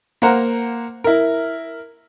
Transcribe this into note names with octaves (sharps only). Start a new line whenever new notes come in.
A#3 C5 F#5 A#5
E4 A#4